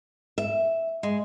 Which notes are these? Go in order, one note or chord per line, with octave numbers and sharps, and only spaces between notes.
E5
G#3